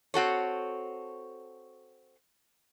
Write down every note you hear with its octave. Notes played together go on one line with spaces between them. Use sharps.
C4 F#4 A4 C#5